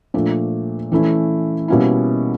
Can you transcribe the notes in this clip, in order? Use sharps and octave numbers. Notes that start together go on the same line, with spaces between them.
A#2 F3 A3 D4
E3 A3 C#4 E4
B2 G3 A#3 C#4 E4